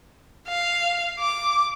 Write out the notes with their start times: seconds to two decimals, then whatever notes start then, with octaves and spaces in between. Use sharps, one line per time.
0.48 F5
1.20 D6